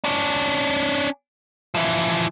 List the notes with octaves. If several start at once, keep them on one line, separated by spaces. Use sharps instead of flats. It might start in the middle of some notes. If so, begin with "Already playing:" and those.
C#4 D4
E3 F3